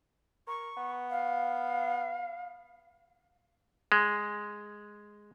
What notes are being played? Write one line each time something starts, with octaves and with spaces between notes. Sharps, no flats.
A#4 C#6
B3
F5
G#3